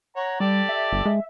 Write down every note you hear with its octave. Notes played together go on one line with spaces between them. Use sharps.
C#5 F#5 A#5
G3 G4 A4 D5
E5
G1
G#3